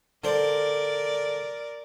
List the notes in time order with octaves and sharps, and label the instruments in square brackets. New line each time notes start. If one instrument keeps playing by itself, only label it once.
[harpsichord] D3 C5 [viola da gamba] A#4 D5